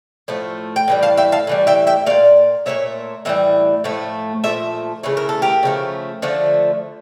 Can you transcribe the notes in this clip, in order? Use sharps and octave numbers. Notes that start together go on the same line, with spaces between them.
A2 F3 A3
G5
A2 E3 G3
F5 A5
E5 G5
F5 A5
A2 E3 G3
E5 G5
E5 G5
A#2 A3 D5 F5
A#2 F3 A3 C#5 E5
A2 E3 G3 E5
A2 F3 A3
A#2 F3 A3 E5
C#3 E3 A3 C#5
A#4
A4
G4 A#4
C#3 F3 A3
D3 F3 A3